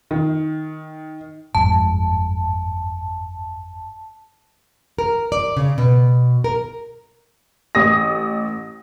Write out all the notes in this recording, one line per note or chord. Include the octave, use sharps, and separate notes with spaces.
D#3
G1 F2 G#2 A5
A#4
D5
C#3
B2
A#4
A1 D#6 A#6